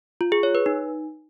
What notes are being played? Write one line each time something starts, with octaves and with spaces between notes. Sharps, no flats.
F4
G#4
C#5
B4
D#4